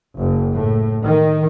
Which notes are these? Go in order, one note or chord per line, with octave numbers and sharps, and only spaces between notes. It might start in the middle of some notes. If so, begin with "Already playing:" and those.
F#1
A2
D#3